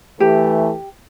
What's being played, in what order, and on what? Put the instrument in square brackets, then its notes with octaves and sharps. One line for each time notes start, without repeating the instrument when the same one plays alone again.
[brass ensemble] E3 A3 [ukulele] G4